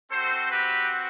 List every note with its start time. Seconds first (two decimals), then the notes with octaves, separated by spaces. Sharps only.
0.10 C4 F#4 A4 C5
0.52 G4 B4